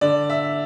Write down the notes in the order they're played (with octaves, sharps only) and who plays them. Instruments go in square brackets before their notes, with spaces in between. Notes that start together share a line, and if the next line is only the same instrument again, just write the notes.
[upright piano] D3 D5
E5